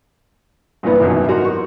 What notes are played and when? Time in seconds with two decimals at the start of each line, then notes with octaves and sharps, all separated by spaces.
0.83 G2 A#2 E3 F3 B3 E4
1.00 G#1 F#2 B2 E3
1.28 D#4 F#4 A#4 C6
1.45 C#6